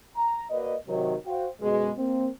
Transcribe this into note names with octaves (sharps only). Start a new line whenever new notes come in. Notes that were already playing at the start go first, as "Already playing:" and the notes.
A#5
A#3 F#4 B4 D5 D#5
C3 D#3 F#3
F#4 C5 F5 G5
F#2 B2 G#3
A#3 C4